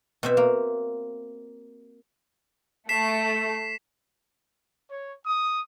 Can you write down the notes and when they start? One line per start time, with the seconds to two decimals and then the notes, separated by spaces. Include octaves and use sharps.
0.23 B2 C4 E5
0.37 A#3
2.89 A3 B6 C7 E7
4.90 C#5
5.26 D#6